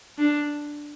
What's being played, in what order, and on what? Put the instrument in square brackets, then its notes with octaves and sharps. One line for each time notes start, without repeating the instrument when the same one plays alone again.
[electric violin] D4